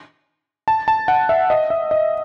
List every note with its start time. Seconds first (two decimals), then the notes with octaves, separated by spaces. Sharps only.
0.68 A5
0.88 A5
1.08 F#5
1.29 E5
1.50 D#5
1.70 E5
1.91 D#5